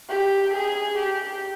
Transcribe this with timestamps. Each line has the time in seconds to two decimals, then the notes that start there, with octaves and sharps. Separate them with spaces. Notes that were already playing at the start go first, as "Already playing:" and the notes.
0.10 G4
0.54 G#4
0.98 G4